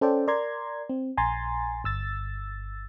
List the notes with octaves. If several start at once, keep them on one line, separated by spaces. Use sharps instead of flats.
C#4 A4 C5 D5 G5
A#4 D5 A#5 C6 G#6
C4
A#1 G#5 A#5 C6 A6
G1 E6 A6